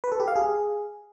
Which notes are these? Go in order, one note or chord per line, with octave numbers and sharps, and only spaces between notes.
B4
A4
G4
F5
G#4